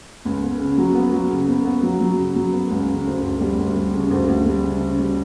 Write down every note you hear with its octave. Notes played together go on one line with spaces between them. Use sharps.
C#2
B3
C#3
F#3
B3
F#3
C#3
B3
B3
F#3
F#3
C#3
F#3
B3
C#2
C#3
D2
D2
G3
D2
G3
C#3
D2
D2
G3
C#3
C#3
G3